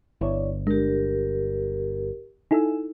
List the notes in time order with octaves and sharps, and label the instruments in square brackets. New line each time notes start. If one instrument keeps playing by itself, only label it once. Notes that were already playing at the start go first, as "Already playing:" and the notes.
[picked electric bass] G1 [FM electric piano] E4 C#5 D5
[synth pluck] G#3 [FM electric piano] D4 [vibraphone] G4 A#4
[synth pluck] D#4 E4 A4 [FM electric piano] G#5 E6